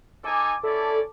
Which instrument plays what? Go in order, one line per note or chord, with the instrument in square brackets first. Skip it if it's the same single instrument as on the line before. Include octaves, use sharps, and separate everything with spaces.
[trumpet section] D#4 A4 G#5 [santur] A5 D6
[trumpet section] C#4 E4 D5 [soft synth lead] A4